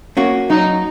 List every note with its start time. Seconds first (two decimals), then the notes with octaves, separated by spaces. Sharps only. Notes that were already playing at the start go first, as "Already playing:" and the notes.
0.17 A#3 C#4 F#4
0.50 F#3 D#4